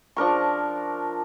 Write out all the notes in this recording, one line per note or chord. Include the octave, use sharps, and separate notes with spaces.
F3 D4 A#4 C#6